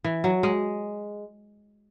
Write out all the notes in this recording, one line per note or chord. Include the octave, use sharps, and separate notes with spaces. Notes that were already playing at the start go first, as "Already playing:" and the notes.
E3
F#3
G#3